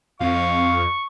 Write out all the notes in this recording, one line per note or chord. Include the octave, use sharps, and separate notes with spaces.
F2 F5 C#6